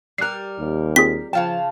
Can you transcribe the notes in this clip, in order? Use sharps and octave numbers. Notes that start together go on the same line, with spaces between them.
G3 A#4 F#6 C7
D#2
C4 F4 G#4 B6
C#3 F3 F4 G5 A5